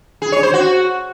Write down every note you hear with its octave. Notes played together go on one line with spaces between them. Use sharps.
G#4
C#5
C5
F#4